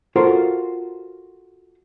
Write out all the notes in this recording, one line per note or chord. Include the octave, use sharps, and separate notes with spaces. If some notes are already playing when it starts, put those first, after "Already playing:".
F4 F#4 A4 A#4 C5